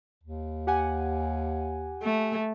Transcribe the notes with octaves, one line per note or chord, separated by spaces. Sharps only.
D#2
G4 F#5 G#5
A3